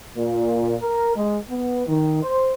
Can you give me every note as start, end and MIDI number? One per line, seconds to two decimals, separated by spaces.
0.15 0.76 46
0.82 1.12 70
1.15 1.37 56
1.49 1.85 59
1.87 2.19 51
2.23 2.53 72